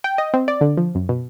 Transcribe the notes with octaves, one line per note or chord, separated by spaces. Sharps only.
G5
D#5
C4
D5
D3
F3
F#2
B2